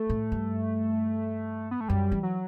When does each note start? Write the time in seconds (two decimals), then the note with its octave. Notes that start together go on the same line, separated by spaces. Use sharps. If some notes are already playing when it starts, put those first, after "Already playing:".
Already playing: A3
0.10 A2
0.32 G2
1.71 B3
1.81 A3
1.88 F#2 G3
2.12 E3
2.23 F#3